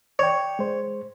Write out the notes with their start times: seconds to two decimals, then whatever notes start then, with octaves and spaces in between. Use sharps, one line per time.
0.19 C#5 D5 G5
0.59 G#3 C5